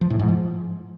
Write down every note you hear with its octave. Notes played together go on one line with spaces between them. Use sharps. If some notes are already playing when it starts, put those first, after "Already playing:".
F3
A2
G#2
F3